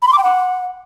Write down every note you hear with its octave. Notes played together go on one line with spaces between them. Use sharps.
B5
C6
D6
G5
F#5